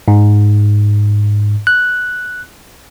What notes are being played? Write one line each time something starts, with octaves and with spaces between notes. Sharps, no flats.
G#2
F#6